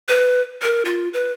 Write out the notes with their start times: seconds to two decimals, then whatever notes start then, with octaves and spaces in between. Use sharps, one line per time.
0.09 B4
0.62 A#4
0.85 F4
1.14 B4